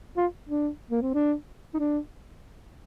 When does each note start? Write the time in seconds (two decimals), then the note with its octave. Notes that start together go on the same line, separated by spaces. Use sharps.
0.16 F4
0.49 D4
0.91 A#3
1.02 C4
1.14 D4
1.74 D#4
1.79 D4